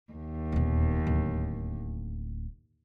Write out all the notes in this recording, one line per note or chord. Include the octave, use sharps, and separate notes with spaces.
D#2
D#1 E2
D1